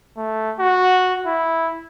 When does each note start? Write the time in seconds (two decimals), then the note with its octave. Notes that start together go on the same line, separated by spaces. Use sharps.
0.17 A3
0.59 F#4
1.26 E4